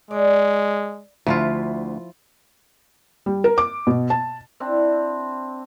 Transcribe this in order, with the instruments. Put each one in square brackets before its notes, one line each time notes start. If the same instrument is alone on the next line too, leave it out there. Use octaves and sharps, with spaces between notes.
[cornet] G#3 [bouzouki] D5
[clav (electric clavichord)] D2 [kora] F3 E4 F4
[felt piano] G3
A#4
D6
B2
A5
[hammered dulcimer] C4 D4 E4